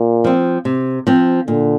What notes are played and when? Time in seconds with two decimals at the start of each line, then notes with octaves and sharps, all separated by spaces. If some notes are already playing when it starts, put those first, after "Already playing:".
Already playing: A#2
0.24 F3 C4
0.65 C3
1.07 F3 C4
1.47 A#2 D3